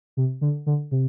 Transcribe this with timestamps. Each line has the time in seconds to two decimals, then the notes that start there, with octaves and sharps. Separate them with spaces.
0.17 C3
0.41 D3
0.66 D3
0.91 C3